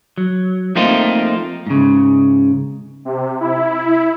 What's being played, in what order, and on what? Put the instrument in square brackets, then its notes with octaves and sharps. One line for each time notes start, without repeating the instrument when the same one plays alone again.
[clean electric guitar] F#3
F3 A3 A#3 C4 D#4 F4
G#2 C#3
[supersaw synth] C3
E4